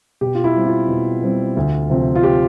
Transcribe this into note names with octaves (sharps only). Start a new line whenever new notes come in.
B2 G4
F4
E4
G3 C4
F4
B2
G3 C4
D2
C3 F3 C4
F4
G4